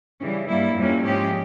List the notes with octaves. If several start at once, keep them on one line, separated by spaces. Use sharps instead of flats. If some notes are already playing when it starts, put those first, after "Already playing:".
C#3 E3 G3 C#4
G2 G3 A#3 E4
F2 C3 G3 A#3 C#4
G#2 F3 G#3 C#4 G4